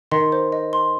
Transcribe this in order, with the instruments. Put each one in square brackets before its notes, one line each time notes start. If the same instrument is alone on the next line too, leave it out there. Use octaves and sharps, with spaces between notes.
[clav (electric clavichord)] D#3 [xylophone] C6
[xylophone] C5
D#5
C6